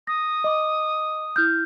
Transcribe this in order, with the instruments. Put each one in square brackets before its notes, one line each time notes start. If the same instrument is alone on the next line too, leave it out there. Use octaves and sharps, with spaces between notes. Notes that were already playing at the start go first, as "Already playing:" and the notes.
[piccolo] D#6 [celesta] A#6
[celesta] D#5 D6
E4 F6 G6